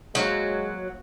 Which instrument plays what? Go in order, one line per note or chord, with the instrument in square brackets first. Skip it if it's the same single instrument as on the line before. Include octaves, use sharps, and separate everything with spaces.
[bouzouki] F#3 [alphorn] G#3 [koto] A#3 F#4 C5